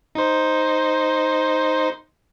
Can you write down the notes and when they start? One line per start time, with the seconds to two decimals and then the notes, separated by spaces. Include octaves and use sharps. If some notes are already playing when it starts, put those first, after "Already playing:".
0.15 D#4 C5